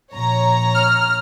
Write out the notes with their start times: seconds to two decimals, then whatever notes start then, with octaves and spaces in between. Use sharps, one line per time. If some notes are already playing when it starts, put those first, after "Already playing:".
0.13 A#1 C#5 A#5
0.74 F6